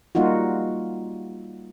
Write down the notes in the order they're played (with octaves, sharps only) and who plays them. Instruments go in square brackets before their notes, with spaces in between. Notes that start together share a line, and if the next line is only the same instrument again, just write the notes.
[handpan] G3 A#3 D#4 F4 F#4